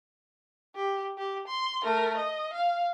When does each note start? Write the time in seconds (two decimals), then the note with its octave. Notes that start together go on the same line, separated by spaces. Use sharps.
0.75 G4
1.18 G4
1.47 C6
1.84 A3 A#4
2.17 D#5
2.53 F5